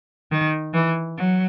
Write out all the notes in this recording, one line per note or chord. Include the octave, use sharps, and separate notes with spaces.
D#3
E3
F#3